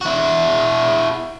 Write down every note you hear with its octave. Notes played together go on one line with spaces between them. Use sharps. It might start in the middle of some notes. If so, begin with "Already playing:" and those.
E4 F#4